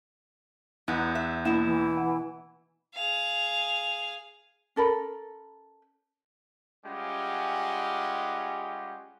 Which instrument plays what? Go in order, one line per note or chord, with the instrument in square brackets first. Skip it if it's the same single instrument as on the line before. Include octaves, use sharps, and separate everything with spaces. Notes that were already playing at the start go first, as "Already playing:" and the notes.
[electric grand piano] E2 [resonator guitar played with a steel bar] B3 D#4 [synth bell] F#6 G6
[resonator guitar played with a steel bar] E5
[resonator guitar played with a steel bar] B2 B3 E4 [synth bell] A#3 E7
[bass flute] E3
[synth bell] F#5
[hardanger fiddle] G#4 F5
[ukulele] C#4 A4 A#4 B5
[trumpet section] G3 G#3 C#4 F4 G4 F#5